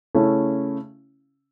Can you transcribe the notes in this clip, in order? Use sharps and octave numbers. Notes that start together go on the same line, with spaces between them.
C#3 A3 C#4 E4